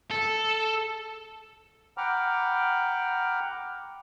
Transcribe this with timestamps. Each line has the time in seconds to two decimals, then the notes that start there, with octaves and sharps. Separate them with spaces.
0.11 A4
1.98 F#5 G5 A#5 B5 D6 F6